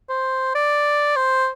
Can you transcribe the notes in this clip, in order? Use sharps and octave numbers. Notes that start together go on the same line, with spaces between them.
C5
D5
C5